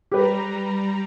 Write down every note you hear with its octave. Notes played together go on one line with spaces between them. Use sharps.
G3 G4 B4 A#5